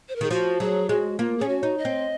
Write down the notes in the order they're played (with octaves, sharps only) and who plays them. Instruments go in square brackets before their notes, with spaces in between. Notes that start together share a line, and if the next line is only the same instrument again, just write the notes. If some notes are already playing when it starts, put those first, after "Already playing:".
[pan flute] C5
A#4
[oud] D#3 [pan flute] G#4
[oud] F3 [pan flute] F#4
[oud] F#3 [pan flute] G#4
[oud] G#3 [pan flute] F#4
[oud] A#3 [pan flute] F4
[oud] C#4 [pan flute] G#4
[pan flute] F#4
[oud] D#4
[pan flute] D#5
[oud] C4